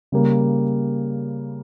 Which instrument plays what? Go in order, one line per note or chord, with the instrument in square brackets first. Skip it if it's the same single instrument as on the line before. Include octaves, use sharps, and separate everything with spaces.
[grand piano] C#3 G3 A#3